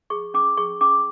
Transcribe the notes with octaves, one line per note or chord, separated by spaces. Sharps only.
G#4 C#6
C#4 D6
G#4 C#6
C#4 D6